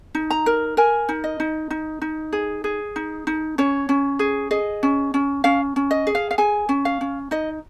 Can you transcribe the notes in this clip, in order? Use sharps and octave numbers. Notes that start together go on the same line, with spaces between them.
D#4
A#5
A#4
A#4 G#5
D#4
D#5
D#4
D#4
D#4
G#4
G#4
D#4
D#4
C#4 C#5
C#4
G#4
G#4 D#5
C#4
C#4
C#4 F5
C#4
D#5
G#4
F5
F5
G#4 G#5
C#4
F5
C#4
D#4 D#5